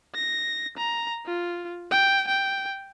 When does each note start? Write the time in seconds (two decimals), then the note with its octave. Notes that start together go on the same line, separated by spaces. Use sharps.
0.15 A#6
0.77 A#5
1.26 F4
1.91 G5
2.28 G5